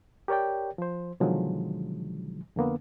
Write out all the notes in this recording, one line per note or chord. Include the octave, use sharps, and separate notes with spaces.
G4 A#4 C#5 D5 G5
F3 C5
B2 D3 D#3 F3 F#3 G#3
F2 D3 A#3 B3